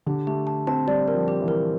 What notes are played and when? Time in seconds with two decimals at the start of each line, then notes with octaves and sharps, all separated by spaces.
0.06 D3 G4
0.27 A3 G4
0.47 A5
0.67 C4 A5
0.87 G3 D5
1.08 A#4
1.14 F3
1.28 G4
1.41 E3
1.48 A#4